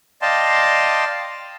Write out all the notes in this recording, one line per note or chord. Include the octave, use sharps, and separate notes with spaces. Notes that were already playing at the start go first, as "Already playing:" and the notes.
D5 D#5 F5 G5 A5 C6